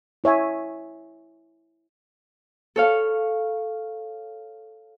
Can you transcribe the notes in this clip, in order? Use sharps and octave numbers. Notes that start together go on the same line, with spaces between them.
E4 C#5 E5 G#5
A4 C#5 F5